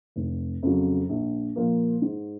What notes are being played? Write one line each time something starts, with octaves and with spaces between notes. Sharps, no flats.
F1
F2 C#3 F#3
A#1
A#2 F3 A#3
G#2